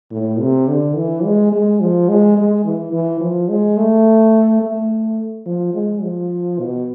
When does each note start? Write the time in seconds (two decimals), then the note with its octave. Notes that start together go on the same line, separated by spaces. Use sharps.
0.12 A2
0.40 C3
0.68 D3
0.96 E3
1.25 G#3
1.52 G#3
1.81 F3
2.09 G#3
2.37 G#3
2.65 E3
2.93 E3
3.21 F3
3.49 G#3
3.77 A3
4.62 A3
5.46 F3
5.74 G#3
6.02 F3
6.59 B2